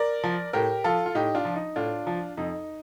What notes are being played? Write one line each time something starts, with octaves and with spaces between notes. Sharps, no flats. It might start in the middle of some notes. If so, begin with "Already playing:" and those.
Already playing: A#4 D5
F3
A2 G4 A#4
F3 F4 A4
F4
A2 D#4 G4
D4 F4
F3
D#4
A2 D4 F4
F3
F2 D#4